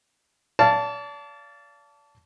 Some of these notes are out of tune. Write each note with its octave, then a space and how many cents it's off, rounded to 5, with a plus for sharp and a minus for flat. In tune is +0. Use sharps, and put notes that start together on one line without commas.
D5 -40 F5 -20 A5 +0